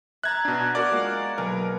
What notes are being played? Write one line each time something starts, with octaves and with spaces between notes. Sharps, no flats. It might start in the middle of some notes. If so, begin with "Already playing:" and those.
E5 A#5 F#6 G#6 A6
B2 D4
F#4 A#4 D5
G#3 A#3 F4
B1 A#4